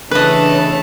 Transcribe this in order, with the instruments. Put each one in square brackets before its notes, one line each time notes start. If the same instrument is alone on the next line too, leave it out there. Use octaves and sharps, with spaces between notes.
[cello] C#3 E3 [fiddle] A3 A5 [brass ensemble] D4 [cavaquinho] B4 D#5